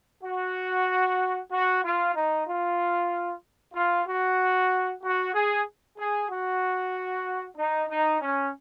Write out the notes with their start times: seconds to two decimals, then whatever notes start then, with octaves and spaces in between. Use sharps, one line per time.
0.23 F#4
1.50 F#4
1.83 F4
2.14 D#4
2.46 F4
3.73 F4
4.06 F#4
5.02 F#4
5.33 G#4
5.97 G#4
6.29 F#4
7.56 D#4
7.89 D#4
8.21 C#4